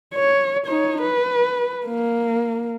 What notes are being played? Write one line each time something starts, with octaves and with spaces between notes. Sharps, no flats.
C#5
D#4 C#5
B4
A#3